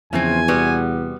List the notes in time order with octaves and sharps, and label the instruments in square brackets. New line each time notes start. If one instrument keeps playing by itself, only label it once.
[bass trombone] E2 [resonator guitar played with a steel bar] C#3 C4 [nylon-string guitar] F3 B3 E5 [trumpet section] G#5
[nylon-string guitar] C3 D5 [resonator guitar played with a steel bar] G3 B3 F#4